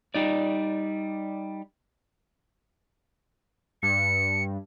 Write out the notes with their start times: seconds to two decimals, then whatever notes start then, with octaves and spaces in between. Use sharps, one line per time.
0.14 G3 D#4 D5
3.83 G2 C#7